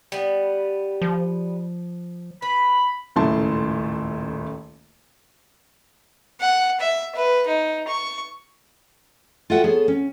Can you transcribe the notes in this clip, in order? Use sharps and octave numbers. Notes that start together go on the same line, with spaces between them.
G3 B3
F3
B4 B5
D#1 C#2 A2 E4 A5 C6
F#5
E5
B4
D#4
C#6
F4 F#4 A4 E5 F#5 G5
B3 G#4 A4 C#5 A5
C#4